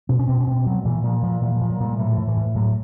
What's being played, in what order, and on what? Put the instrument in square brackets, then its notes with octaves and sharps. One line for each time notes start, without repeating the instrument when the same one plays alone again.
[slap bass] B2 C#4
C#4
B2 C4
C#4
B2 C4
B2 F#3
A#2 E3
A#2 F3
A#2 F3
A#2 E3
A#2 F3
F#3
A#2 G3
A2 F#3
A2 F3
E3
A2
A2 F#3